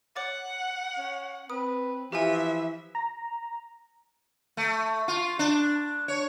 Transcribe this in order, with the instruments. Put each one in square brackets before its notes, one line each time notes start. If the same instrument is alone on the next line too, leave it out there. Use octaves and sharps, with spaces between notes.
[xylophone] C#5 D6 A6 [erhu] F#5
[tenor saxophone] C#4
[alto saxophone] C4 [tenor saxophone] B4 [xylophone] D#6
[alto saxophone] E3 [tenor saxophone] F3 [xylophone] G4 G#5 [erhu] E5
[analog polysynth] A#5
[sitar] A3
F4
D4
C#5